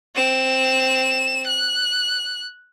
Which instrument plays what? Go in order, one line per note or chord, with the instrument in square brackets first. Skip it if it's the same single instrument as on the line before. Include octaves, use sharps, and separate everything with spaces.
[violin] C4 E7
F#6